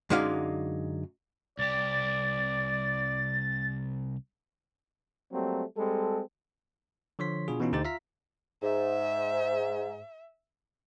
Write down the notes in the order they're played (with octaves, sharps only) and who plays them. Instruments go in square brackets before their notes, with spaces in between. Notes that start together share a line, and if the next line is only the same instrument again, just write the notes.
[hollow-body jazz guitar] F#2 D3 G#3 D#4 D5 F5
[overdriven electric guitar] C2 G4 [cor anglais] D5 [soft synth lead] A6
[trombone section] F#3 G3 A3 A#3 C4
G3 G#3 C4 A4
[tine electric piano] D3 F3 C#5 C6 B6
B2 D4 F4 G#4
B2 E3 B3 C#4 D#4 F4
D2 D3 D#4 G4 C5 A6
F4 E5 F5 A#5 B6
[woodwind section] G#2 [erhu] E5